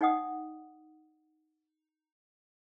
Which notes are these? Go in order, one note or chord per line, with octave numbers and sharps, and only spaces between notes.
D#4 D5 D#5 F#5 G5 D#6